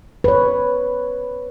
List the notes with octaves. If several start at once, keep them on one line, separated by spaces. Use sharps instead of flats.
B4 C#5